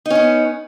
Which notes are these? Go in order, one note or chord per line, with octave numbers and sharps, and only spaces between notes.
B3 C#4 D#4